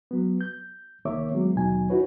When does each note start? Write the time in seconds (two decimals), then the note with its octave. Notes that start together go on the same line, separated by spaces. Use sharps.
0.11 F#3 B3
0.41 G6
1.05 C2 D#3 A#3 C#5 E5 D6
1.32 F#3 G#3 B3
1.56 D#2 B2 F#3 D#4 G#5
1.90 D#4 E4 F#4 B4 C#5